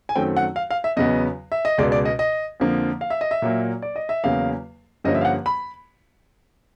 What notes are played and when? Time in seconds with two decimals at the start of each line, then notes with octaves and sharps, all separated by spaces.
0.09 G#5
0.16 F#2 D#3 F#3 A3 C4 G5
0.37 F#5
0.56 F5
0.71 F5
0.84 E5
0.96 E2 C#3 F#3 B3 D#5
1.52 E5
1.65 D#5
1.78 C#2 B2 G#3 D5
1.92 D5
2.05 D#5
2.19 D#5
2.60 F2 D3 F3 A#3
3.01 F5
3.10 E5
3.21 D#5
3.31 E5
3.42 A#2 F#3 A#3
3.82 D5
3.96 D#5
4.09 E5
4.24 E2 C#3 F#3 A#3 F5
5.04 G2 D3 F3 A#3 C#4 D#5
5.15 E5
5.21 F5
5.25 F#5
5.46 B5